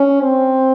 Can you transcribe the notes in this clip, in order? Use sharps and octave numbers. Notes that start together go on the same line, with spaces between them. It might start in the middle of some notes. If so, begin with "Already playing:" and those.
Already playing: C#4
C4